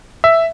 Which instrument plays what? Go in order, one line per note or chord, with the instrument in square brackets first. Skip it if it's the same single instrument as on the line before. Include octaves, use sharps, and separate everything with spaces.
[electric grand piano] E5